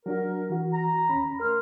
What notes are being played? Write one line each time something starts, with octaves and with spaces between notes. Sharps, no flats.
F#3 D4 F#4 A#4
E3 F#4
A#5
D#2 C#4 B5
A3 A#4 C6 F6